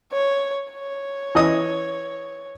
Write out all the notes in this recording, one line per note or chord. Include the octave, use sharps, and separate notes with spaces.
C#5
C#5
E3 D#5 D#6